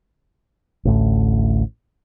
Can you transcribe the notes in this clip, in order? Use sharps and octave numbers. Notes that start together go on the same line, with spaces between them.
A1 D2 A2